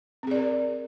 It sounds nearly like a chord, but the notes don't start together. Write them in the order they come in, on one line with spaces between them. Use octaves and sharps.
C4 G#4 D5 A#4